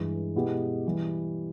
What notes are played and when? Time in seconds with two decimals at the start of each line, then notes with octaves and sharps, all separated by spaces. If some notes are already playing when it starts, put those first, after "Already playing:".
Already playing: G2 E3 G#3
0.35 B2 G#3 B3 E4 G4
0.87 E3 G3